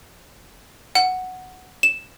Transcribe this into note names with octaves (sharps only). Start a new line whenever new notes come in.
F#5
E7